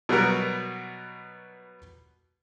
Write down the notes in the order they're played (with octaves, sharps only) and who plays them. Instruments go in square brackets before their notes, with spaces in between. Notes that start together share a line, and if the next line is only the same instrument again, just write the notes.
[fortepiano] B2 F#3 G3 B3 F#4 A#4